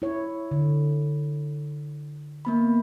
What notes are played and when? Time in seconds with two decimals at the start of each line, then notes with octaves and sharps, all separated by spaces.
0.02 E4 C#5
0.51 D3
2.45 A#3 B3 B5